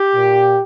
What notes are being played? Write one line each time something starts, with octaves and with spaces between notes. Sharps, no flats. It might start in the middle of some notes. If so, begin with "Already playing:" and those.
Already playing: G4
A#2